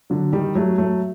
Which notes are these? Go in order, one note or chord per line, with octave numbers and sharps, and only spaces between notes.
D3 F#3
D#3 G3
F#3 A3
F#3 A3